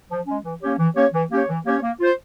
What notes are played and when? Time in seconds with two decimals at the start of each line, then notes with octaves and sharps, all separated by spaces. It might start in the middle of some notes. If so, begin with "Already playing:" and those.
0.11 F3
0.27 G#3 C#4
0.44 E3
0.63 A#3 C#4 G4 C#5
0.79 E3
0.96 A#3 C#4 G4 C#5
1.14 E3
1.31 A#3 C#4 G4 C#5
1.49 E3
1.65 A#3 C#4 G4 C#5
1.82 A#3
2.00 F4 C5